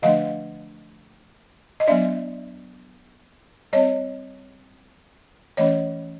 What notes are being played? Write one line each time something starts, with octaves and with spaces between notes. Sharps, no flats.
D3 F3 A3 D4 D#5 F5
D#5
F#3 B3 D4 D5 E5
G3 C4 C#5 D#5
E3 A3 C#4 C#5 D#5